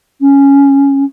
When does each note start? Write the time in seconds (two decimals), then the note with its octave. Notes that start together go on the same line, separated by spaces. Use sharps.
0.20 C#4